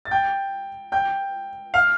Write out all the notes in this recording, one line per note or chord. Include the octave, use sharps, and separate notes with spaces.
A6
G5 G6
G5 G6
F5 F6